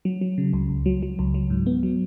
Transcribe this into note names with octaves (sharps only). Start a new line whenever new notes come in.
F#3
F#3
C#3
C#2
C#2
F#3
F#3
C#2
F#3
G#2
B3
F#3